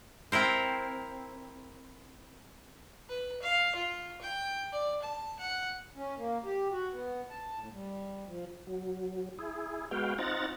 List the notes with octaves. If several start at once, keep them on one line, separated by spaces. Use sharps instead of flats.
C4 E4 A#4 C5
B4
F5
F4
G5
D5
A5
F#5
C#4
A#3
G4
F#4
B3
A5
A2
G3
F3
F#3
E4 G#4
G#3 B3 F#4 F5 G5
C4 D#4 F4 F#5 A#5 A6